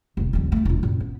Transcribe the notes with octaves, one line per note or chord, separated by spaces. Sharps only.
F1 A#2
D#1 F3
G#2 A3
E1 F4
F#2 A#2
B3